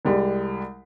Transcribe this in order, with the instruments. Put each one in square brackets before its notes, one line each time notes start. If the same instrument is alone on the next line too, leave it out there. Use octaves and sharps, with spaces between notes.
[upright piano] C2 G3 G#3